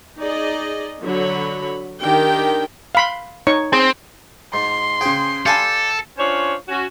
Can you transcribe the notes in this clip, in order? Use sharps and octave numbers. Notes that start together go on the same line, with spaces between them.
D#4 G#4 D5 D#5
D3 F#3 F#4 C#5 B5
D#3 D4 G4 G5
F5 B5 C6
D#4 C#5 C#6
C4 G#4
G#2 C6
C#3 G#4 C5 G5
G4 A4 D5 F5 G#5 A5 B5
C#4 D4 F4 C5 C#5
C#4 F#4